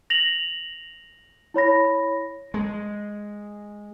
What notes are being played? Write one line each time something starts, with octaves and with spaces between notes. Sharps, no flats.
A#6 F7 F#7
E4 C#5 B5 A#6
G#3